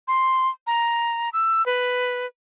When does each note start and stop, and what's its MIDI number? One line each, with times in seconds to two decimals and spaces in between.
0.08 0.48 84
0.67 1.29 82
1.33 1.65 88
1.66 2.26 71